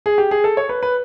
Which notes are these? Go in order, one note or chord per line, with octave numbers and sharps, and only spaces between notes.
G#4
G4
G#4
A4
C#5
B4
B4